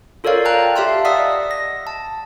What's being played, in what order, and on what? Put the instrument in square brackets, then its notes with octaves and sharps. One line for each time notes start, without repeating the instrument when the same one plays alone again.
[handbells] F4 A4 A#4 C#5 D5 F5
G5 A5 A#5 F#6
G4 E5 F5 A5 C6
D5 D#5 F#5 D#6 E6 B6
A#6
A5